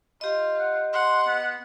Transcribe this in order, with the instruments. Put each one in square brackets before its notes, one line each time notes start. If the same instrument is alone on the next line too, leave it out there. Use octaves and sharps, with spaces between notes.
[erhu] F4 [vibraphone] G4 D#5
[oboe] F#5
[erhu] F#5 [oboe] C6
[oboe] B3